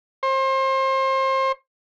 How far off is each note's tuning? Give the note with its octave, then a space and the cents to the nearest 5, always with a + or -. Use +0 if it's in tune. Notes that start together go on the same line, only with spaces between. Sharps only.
C5 +30